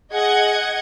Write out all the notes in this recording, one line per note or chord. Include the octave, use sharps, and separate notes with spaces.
G#4 D#5 F#5 G#6